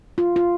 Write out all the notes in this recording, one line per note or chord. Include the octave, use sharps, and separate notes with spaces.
F4
F4